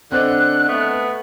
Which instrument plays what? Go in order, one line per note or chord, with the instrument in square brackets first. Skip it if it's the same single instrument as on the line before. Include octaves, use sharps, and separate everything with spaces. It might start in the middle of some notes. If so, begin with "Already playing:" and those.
[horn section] D3 [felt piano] C4 C5 D#5 [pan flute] F#6
[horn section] A3 B3